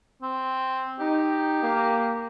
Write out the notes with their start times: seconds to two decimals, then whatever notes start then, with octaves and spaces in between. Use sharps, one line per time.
0.22 C4
0.99 D#4 G4
1.61 A#3